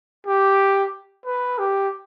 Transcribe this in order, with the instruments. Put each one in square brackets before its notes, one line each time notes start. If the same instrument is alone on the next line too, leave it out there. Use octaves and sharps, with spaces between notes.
[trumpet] G4
B4
G4